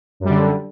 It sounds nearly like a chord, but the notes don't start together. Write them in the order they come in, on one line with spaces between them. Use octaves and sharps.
F#2 G3 D3